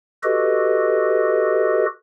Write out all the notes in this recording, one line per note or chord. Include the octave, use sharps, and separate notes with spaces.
F#4 G4 A4 B4 D#5